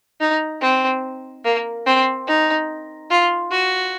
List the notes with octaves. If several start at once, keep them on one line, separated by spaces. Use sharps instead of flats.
D#4
C4
A#3
C4
D#4
F4
F#4